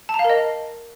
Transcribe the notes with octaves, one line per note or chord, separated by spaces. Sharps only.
A5
A#5
F5
A#4
D#5